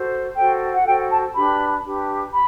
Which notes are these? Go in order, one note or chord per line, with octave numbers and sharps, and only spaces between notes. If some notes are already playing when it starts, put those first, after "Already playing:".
Already playing: F#4 A4 C5
F#4 A4 C5 G5
F#5
F#4 A4 C5 G5
A5
D4 G4 B4 B5
D4 G4 B4
B5